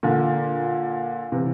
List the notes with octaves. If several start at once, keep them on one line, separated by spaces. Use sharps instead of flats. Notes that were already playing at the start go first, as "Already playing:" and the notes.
A#2 D3
C3 E3